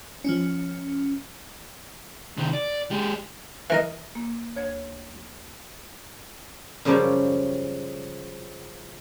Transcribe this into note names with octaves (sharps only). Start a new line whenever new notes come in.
F3 C#4
C3 D#3
D5
G#3 G4
E3 A#4 D#5
A#3
D2 C#5 G#6
F#2 C#3 F3 G3 G4 C#5